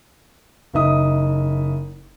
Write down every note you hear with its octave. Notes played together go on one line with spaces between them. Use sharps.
F#1 D#4 E5 D#6